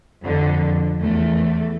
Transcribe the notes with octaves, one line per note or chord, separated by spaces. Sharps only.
F2 D3
E2 A3